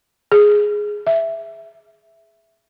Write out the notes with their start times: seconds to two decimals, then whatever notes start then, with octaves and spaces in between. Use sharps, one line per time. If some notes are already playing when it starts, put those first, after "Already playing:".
0.32 G#4
1.07 E5